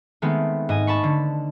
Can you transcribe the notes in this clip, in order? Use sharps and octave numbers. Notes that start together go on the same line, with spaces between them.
D#3 G#3 A3 B3 C4
G#2 D#5 G#5
A5 B5 C#6
D3